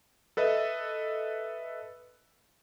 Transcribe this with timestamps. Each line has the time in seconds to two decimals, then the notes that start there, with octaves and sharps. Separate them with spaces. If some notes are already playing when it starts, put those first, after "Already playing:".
0.37 A4 B4 D#5 E5